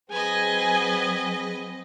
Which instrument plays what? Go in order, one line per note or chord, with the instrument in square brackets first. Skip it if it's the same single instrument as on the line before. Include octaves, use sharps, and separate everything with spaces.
[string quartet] F#3 C4 [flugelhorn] G#4 [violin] B4 D#5 [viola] G#5